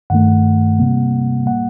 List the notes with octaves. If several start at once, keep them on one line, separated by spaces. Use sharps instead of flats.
G2 D#3 A3 F#5
C3 G3 A#3
A2 G3 A#3 F#5